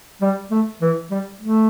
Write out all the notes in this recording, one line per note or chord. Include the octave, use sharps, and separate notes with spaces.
G3
A3
E3
G3
A3